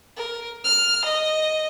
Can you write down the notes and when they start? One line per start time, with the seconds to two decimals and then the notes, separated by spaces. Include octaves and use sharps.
0.16 A#4
0.64 F6
1.05 D#5